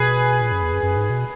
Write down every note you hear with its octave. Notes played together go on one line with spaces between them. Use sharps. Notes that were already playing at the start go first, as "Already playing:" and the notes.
Already playing: B2 G#4 B4
A#2
F#2
E2
F#2
F#2
G#2
B2